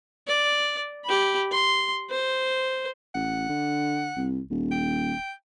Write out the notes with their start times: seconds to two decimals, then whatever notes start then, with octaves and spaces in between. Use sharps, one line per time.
0.27 D5
1.05 G4 B5
1.52 C6
2.10 C5
3.15 A1 F#5
3.49 D3
4.17 C2
4.50 D#1
4.72 G5